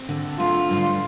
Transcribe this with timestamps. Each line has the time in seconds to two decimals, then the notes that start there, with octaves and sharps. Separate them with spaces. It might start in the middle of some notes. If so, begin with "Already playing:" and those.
Already playing: C4
0.09 D3
0.39 A3 F4
0.70 G2